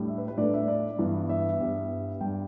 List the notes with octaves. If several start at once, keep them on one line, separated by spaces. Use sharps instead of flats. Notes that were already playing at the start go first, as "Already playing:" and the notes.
Already playing: A2 G3 D4
E5
B4
B4
A2 A3 D4 D5
E5
D5
G2 E3 B3
E5
G2 G3 B3
G2 G3 D4 G5